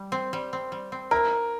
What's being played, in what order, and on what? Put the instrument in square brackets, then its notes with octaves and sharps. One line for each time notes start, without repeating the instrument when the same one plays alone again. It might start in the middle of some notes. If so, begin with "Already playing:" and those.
Already playing: [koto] G3
C4
G3
C4
G3
C4
[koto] E4 [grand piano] A#4